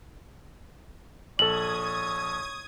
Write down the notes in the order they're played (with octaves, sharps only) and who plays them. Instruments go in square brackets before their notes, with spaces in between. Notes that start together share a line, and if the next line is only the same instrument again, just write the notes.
[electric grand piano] A#1 A4 [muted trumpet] C#5 [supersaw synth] D#6 G#6 [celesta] F#7